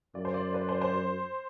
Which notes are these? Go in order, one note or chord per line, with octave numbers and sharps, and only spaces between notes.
F#2 D5
C5
D5
B4
C5
C5